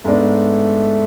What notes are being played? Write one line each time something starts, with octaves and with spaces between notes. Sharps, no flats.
G#2 G#3 A3 B3 D4